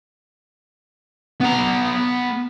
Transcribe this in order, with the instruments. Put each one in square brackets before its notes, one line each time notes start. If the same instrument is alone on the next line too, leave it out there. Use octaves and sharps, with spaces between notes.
[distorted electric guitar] B3 A#5